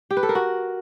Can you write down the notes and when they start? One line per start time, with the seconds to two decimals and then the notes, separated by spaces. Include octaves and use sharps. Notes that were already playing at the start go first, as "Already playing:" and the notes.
0.11 G4
0.17 B4
0.23 A4
0.29 A#4
0.35 F#4